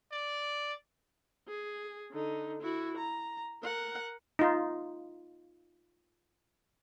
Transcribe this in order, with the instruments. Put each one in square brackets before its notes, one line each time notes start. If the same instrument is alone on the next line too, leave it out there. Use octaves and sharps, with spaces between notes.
[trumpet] D5
[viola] G#4
D3 D#4
E4 F#4
A#5
A#4 F#5
[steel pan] D#4 F4